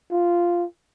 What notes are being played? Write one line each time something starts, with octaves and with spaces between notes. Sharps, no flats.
F4